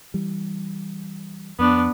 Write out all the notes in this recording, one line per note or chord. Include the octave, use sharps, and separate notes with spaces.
E3 G3
F2 B3 D4